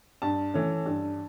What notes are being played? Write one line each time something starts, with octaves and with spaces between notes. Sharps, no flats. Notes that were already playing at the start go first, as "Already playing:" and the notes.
G2 A5
E3 A3 C#4
G2